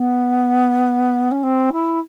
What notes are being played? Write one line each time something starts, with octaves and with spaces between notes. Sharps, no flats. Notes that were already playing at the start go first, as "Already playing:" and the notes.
Already playing: B3
C#4
C4
E4